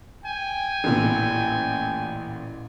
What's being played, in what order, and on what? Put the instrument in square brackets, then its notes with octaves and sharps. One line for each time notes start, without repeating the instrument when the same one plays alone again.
[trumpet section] G5 G#5
[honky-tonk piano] A1 A#2 E3